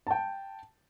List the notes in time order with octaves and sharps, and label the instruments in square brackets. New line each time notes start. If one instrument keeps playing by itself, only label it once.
[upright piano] G5 A5